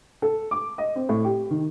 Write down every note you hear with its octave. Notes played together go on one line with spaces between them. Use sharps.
A4
D6
D#5
C4
A2
G4
D#3